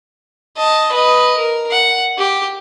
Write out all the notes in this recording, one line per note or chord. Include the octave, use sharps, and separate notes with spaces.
D#5 A5
B4 D#5
A#4
F#5
G4